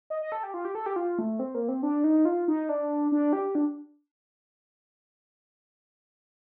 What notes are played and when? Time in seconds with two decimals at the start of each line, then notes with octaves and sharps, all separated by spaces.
0.10 D#5
0.22 D#5
0.32 A4
0.43 G4
0.54 F4
0.65 G4
0.75 A4
0.86 G4
0.96 F4
1.19 A3
1.39 C4
1.55 A#3
1.69 C4
1.83 D4
2.04 D#4
2.25 F4
2.48 D#4
2.69 D4
3.12 D4
3.33 G4
3.55 D4